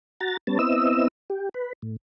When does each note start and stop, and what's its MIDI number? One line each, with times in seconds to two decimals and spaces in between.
0.21 0.37 66
0.21 0.37 82
0.21 0.37 93
0.47 0.58 55
0.47 0.58 59
0.47 0.58 61
0.47 0.58 81
0.59 1.08 59
0.59 1.08 60
0.59 1.08 64
0.59 1.08 75
0.59 1.08 88
1.30 1.49 67
1.54 1.73 71
1.82 1.96 45